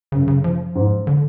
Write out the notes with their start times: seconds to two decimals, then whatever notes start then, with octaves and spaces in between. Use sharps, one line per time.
0.12 F#2 C#3
0.28 C#3
0.44 F3
0.75 G#2
1.07 D3